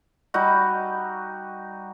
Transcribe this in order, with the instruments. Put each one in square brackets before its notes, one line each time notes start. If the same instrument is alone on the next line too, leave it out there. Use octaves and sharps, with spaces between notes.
[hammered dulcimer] G3 D#4 F#4